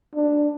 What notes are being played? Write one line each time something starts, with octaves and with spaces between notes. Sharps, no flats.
D4